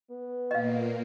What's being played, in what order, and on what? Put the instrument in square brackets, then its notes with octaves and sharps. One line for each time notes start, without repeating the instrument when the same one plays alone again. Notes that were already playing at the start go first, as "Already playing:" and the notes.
[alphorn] B3
[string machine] A#2 A#3 [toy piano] D#5 F5